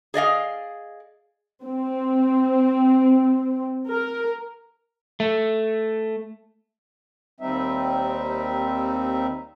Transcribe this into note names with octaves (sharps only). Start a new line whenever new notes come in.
G#4 D5 D#5 F5
C4
A#4
A3
D#2 G3 C4 D#4 E5